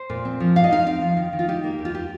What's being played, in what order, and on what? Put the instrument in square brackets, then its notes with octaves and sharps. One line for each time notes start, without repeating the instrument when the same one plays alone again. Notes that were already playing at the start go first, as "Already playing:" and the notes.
Already playing: [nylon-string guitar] C5
A#2
C4
F3
G2 F5
D#5
D#4 F5
C4 F5
F3
D#3
D#3
F4
D#4 G4
A#3
D#2
F4
G4